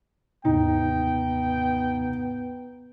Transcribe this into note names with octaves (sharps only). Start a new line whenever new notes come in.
D#2 G#2 C3 B3 D#4 G5